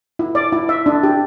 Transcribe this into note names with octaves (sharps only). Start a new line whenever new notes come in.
E4
D5
E4
E5
D4
G4